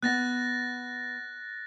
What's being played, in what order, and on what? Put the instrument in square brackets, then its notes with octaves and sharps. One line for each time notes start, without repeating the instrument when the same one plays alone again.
[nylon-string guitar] B3 F#5 [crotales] F#6 A6 A#6